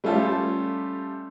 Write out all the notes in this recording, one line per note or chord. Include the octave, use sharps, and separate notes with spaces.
G3 A3 C#4 F4 G4 A4